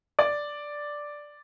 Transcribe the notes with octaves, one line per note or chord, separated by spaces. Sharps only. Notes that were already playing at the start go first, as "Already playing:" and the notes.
D5